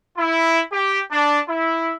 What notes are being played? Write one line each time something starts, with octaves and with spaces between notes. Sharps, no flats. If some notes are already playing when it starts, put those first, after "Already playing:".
E4
G4
D4
E4